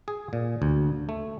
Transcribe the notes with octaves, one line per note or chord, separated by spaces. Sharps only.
G#4
A#2
D2
A3